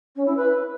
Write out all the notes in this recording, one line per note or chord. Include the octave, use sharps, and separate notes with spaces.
C#4
E4
B4